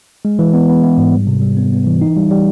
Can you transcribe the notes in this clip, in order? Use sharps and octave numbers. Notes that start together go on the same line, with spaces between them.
G#3
E3
B3
B3
B3
G#2
G3
C3
G3
B3
B3
E3
D#4
G3
G3